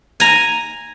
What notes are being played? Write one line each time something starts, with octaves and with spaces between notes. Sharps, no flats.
G#5 A#5